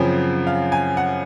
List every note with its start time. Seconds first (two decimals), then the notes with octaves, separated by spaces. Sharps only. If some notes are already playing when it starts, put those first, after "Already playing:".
Already playing: F#2 C#3 F3 C4
0.47 F5
0.72 G#5
0.97 F#5